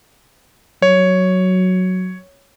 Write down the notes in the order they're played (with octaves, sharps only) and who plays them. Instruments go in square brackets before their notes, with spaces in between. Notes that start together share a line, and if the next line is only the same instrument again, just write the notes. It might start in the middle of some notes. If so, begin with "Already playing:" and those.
[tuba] F#3 [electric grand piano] C#5